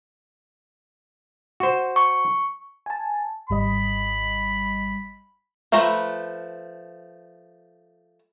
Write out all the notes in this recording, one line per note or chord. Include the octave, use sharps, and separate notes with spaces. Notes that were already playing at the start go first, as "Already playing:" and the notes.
F#4 C5
C#6
G#5 A5
G#1 G3 D#5 B5
F3 A3 B4 A#5